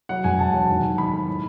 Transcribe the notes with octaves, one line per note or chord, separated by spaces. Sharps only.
F#3 F#5
E1 G#5
E1 A5
F#3
D#2
D#3
D#2 B5
A3
A2